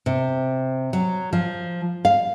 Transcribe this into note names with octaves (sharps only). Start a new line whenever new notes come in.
C3
F#3
F3
F5